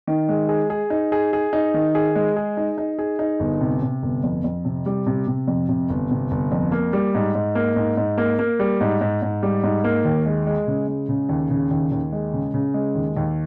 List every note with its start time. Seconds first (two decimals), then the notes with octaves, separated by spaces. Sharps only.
0.08 D#3
0.29 G#3
0.49 G#4
0.70 G#4
0.90 D#4
1.12 G#4
1.33 G#4
1.53 D#4
1.74 D#3
1.95 G#4
2.16 G#3
2.36 G#4
2.57 D#4
2.78 D#4
2.99 G#4
3.19 D#4
3.40 G1
3.61 C3
3.82 C3
4.03 G1
4.23 F2
4.44 F2
4.65 C3
4.86 G3
5.06 C3
5.27 C3
5.48 F2
5.69 C3
5.90 G1
6.11 C3
6.31 G1
6.52 F2
6.72 A#3
6.93 G3
7.14 G#2
7.35 G#2
7.55 A#3
7.76 G#2
7.97 G#2
8.18 A#3
8.39 A#3
8.60 G3
8.80 G#2
9.01 G#2
9.22 G#2
9.43 G3
9.63 G#2
9.84 A#3
10.05 D#2
10.26 G#3
10.47 G#3
10.67 C#3
10.88 G#3
11.09 C#3
11.29 D#2
11.50 C#3
11.71 D#2
11.92 D#2
12.12 G#3
12.33 C#3
12.54 C#3
12.74 G#3
12.95 D#2
13.17 D#2